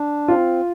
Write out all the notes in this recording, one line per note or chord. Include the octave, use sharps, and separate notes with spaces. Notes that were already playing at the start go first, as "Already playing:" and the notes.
Already playing: D4
C4 F4